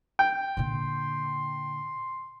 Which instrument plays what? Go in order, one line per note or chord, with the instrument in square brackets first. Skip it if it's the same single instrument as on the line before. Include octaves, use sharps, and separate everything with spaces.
[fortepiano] G5
[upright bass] A#2 D3 [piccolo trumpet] C6